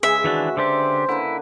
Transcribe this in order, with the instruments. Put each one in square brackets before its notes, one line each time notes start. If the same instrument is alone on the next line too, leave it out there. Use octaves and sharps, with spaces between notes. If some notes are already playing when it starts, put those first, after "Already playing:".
[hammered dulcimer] C#3 G#3 B4 [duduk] G#4 [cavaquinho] E5
[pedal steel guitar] D#3 E3 D4 [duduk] F#4
[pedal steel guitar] D3 D4 G4 [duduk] C5
[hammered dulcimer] D3 A#3 B4 [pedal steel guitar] E4